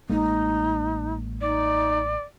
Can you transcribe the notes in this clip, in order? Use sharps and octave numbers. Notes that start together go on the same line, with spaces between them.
A1 G#3 A#3 D#4
D#4 D5